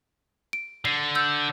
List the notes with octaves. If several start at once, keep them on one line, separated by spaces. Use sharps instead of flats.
D7
D3 C7
E6 G6